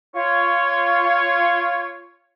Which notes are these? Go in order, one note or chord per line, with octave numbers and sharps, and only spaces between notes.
F4 C#5